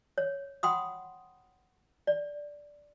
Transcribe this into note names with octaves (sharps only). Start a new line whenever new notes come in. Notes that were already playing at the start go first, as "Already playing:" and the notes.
C#5
F#5 G5 B5 C6 D#6
D5